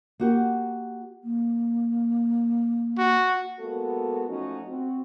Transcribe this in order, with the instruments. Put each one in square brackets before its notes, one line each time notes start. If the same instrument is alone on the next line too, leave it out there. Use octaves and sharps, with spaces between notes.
[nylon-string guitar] A#3 F#4 G4
[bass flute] A#3
[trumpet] F#4
[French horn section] G#3 A#3 B3 F#4 A4
F3 F#3 A3 C#4 D#4 F#4
C4 F#4